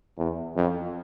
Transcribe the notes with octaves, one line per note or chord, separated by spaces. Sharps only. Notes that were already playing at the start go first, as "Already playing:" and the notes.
E2
F2